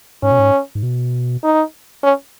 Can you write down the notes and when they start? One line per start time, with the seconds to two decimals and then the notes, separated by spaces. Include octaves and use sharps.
0.23 G#2 C#4
0.31 B2
0.39 G#2
0.75 G#2
0.83 B2
1.44 D#4
2.03 C#4